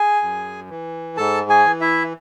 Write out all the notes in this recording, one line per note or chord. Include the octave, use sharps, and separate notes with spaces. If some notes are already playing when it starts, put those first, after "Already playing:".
Already playing: G#4 G#5
F#2
E3
G#2 A4 A5
G#4 G#5
E3
E4 E5